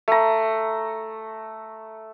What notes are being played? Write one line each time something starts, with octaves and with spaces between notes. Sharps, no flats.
A3 A#5